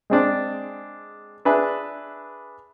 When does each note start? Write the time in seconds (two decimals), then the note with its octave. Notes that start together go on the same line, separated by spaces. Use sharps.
0.10 G#3 C4 D4
1.45 D4 G#4 B4 E5